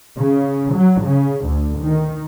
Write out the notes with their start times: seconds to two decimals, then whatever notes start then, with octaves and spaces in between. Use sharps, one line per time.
0.19 C#3
0.73 F#3
1.03 C#3
1.46 D2
1.81 D#3